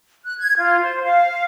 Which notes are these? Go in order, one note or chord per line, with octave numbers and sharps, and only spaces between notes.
F#6
G#6
F4
C5
F5